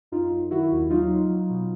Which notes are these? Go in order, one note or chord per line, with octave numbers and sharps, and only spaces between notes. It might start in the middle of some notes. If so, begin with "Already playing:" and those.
F#2 D#4 F4
F#2
D#3 E4 F#4
D#2
F#3 D#4 F4
F#3
F#3
B2